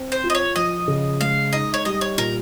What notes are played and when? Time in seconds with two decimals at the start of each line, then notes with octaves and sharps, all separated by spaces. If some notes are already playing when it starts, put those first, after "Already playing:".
Already playing: C4
0.12 C5
0.24 F4
0.30 D#5
0.35 C#5
0.56 F3 D#5
0.88 C#3
1.21 G#3 F5
1.53 D#4 D#5
1.74 C#5
1.85 G3 D#5
2.01 C#5
2.18 A#2 A#4